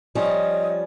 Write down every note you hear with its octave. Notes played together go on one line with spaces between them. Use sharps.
F3 G3 C#4 D#5